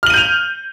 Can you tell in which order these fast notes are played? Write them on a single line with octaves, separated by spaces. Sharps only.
F6 F#7 D#7 G6 F7